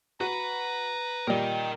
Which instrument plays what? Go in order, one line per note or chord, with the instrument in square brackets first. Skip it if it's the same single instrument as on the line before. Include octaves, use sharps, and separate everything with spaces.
[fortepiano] F#4 [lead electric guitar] B4 B5 [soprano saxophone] A#5
[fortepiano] A#2 G3 [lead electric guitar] A#4 D#5 [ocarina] G5